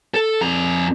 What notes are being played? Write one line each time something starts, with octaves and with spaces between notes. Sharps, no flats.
A4
F2 A#5